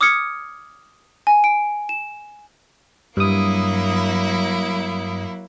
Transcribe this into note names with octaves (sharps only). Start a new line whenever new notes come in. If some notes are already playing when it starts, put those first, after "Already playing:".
D6 D#6 F6 G#6 C#7
G#5
D7
E7
G2 F#3 A#3 E4 D#6